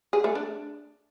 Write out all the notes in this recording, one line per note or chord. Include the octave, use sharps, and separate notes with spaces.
G#4
A3
D4